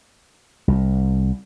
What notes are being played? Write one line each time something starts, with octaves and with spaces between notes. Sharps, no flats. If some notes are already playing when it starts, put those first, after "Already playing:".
C2